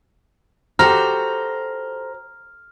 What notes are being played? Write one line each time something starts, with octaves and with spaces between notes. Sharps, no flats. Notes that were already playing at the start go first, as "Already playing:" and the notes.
F#4 G4 A4 C5 A#5 F6